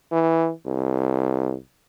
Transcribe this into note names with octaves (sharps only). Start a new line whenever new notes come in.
E3
C2